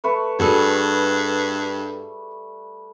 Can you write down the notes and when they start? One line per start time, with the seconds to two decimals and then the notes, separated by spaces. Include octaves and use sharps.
0.04 A3 B4 C#6
0.39 G2 G3 F#4 G#4 A4